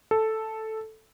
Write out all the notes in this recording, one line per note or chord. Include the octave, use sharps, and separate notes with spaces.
A4